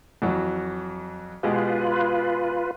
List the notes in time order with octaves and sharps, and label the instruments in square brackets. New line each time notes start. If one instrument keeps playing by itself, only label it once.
[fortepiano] F2 E3 F#3
[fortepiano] B2 G#3 G4 [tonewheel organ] F4 B4